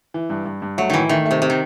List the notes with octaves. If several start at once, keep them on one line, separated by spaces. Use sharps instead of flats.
E3
G2
G2
G2
F#3 A3
A2 D#3 E3
D#3 A3
A3
C3
C3
D#3